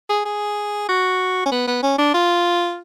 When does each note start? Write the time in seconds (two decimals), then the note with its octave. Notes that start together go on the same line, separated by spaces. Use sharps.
0.09 G#4
0.25 G#4
0.88 F#4
1.46 C#4
1.52 B3
1.67 B3
1.83 C#4
1.98 D4
2.14 F4